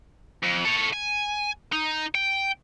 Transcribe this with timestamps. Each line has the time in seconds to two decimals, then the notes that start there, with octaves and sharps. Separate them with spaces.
0.43 F2
0.65 A4 C#5
0.93 G#5
1.73 D#4
2.15 G5